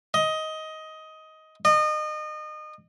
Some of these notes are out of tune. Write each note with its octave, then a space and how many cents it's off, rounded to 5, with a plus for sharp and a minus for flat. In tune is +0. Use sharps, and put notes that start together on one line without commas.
D#5 +15
D#5 -30